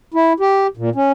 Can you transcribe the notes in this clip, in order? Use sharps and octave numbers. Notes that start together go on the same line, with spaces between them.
E4
G4
A#2
C#4